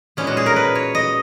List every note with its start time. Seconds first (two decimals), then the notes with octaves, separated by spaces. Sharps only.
0.17 A#2 G#3 B3 C#4
0.27 F#4
0.37 G#4
0.46 A#4
0.56 B4
0.75 C#5
0.95 D#5